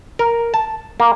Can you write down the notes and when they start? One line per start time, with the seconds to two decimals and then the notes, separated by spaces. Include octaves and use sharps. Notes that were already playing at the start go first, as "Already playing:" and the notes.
0.19 A#4
0.54 A5
1.00 A#3